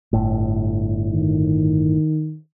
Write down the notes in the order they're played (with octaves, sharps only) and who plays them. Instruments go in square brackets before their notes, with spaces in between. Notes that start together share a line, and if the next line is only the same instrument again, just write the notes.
[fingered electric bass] G1 A2
[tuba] D#3